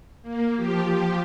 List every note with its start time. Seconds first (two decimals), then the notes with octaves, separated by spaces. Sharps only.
0.22 A#3
0.56 F3 G4